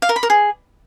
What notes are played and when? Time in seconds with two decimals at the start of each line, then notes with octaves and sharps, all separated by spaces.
0.02 F5
0.09 A#4
0.16 B5
0.23 A#4
0.30 G#4